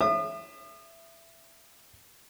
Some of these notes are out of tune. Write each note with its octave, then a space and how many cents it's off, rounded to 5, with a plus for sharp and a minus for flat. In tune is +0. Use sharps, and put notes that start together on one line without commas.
E5 +15 D#6 -40